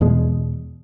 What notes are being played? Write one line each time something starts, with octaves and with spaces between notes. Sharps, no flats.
E2 B2 G#3